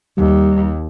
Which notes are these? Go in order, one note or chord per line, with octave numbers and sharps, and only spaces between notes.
D#2 G3